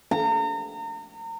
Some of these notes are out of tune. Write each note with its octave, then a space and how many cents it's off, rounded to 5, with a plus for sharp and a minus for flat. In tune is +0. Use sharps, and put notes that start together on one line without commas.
A#5 -35